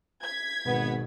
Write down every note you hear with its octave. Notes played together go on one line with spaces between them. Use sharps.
G#6 B6
G#1 B2 B3